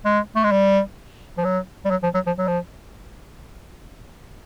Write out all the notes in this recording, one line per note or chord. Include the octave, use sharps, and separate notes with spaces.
G#3
A3
G#3
G3
F3
F#3
G3
F#3
F3
F#3
F3
F#3
F3